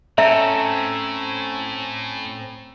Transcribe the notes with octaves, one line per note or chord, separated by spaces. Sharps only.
A2 C4 C#4 A4 E5 A#5